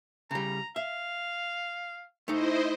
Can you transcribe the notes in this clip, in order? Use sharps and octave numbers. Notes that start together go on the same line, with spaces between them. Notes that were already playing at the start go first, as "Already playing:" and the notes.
C#3 G3 A#5
E5 F5
A3 D#4 E4 C5 D#5